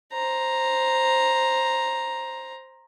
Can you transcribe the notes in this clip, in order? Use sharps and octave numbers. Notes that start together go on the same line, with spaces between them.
C5 A#5